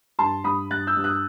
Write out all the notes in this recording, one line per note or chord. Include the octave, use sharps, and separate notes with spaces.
G2 A5 C6
G2 B5 D#6
G2 F#6 A6
E6 G6
G2
D#6 F#6